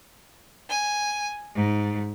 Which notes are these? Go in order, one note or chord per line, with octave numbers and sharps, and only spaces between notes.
G#5
G#2